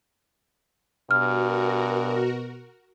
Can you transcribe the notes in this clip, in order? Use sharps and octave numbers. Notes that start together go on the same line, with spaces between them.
G2 B2 F#4 A#4 F6